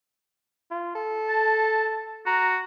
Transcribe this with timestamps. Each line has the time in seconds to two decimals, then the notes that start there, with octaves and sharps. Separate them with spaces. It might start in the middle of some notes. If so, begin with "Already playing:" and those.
0.71 F4
0.95 A4
1.29 A5
2.26 F#4 A#5